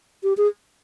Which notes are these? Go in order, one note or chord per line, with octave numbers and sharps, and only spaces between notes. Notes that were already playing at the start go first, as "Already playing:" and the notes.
G4
G#4